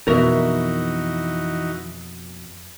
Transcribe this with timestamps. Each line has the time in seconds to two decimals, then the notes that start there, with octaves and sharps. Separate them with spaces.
0.08 F2 B2 E3 D#4 F#4 A#4 E5